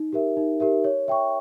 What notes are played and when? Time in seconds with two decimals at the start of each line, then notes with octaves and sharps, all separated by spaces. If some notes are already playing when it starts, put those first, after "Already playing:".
Already playing: D#4
0.13 G4 A#4 E5
0.37 D#4
0.60 G4 A#4 E5
0.84 C#5
1.08 E5 G5 C#6